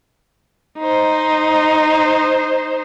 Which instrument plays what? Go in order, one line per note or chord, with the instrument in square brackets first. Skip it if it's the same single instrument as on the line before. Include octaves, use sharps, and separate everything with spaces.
[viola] D#4 C5